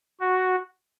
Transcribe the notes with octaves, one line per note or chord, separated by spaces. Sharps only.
F#4